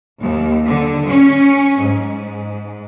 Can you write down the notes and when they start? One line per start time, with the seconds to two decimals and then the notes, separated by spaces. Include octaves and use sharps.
0.21 D#2
0.67 D3
1.10 C#4
1.81 G#2